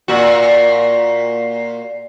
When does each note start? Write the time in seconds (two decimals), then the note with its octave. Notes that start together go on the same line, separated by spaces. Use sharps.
0.08 A#2 F#4